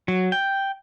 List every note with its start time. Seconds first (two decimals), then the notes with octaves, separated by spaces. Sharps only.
0.08 F#3
0.32 G5